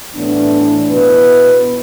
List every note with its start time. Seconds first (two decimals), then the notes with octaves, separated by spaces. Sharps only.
0.13 A2 E3 B3 D4
0.90 B2 B3 E4 B4